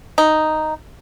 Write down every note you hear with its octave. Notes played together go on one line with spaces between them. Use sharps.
D#4